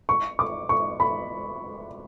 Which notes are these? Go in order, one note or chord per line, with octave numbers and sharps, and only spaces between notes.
C#6
D6
C#6
B5